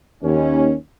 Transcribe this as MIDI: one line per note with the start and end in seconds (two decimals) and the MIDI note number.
0.23 0.73 39
0.23 0.73 61